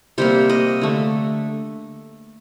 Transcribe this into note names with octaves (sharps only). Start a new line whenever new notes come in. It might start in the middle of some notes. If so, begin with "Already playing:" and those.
C3 G3 A#3 C5
D#5
D3 A3